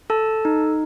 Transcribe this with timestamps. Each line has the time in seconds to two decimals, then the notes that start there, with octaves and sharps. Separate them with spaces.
0.10 A4 A5
0.45 D#4